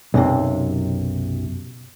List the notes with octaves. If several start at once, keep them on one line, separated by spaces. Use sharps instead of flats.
B1 F#2 C3